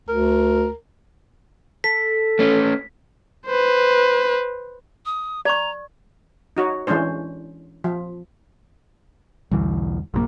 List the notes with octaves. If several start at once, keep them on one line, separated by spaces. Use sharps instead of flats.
D2 A#4
A4 B6
A3 C#4
B4 C5
D#6
D5 A#5 C#6
D#4 F#4 C#5
E3 G#3 C#4 D4 C5
F3
B1 E2 D3 E3 G3
A#1 F#2 C3 F3 F#3 A#3